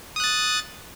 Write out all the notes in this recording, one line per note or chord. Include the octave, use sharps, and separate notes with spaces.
D#6 F#6 A6